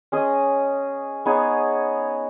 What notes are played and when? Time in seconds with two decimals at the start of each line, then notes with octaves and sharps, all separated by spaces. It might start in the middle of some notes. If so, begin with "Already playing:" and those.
0.12 C#4 G#4 D#5
1.26 B3 D#4 G#4 C#5